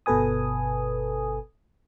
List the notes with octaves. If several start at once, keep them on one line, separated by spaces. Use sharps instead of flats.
G1 B2 A4 B4 G#5 D#6